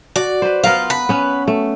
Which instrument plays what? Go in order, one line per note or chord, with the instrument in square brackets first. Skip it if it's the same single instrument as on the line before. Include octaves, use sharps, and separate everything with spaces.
[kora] F#4 [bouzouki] D5
[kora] B4 C5
[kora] B3 A#4 F5 [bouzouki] F4
[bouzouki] B4
[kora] B3 C#4
A3